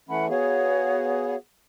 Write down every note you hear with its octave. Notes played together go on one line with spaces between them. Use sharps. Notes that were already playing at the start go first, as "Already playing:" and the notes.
E3 A3 C#4 F#5 B5
B3 F#4 G#4 C#5 F5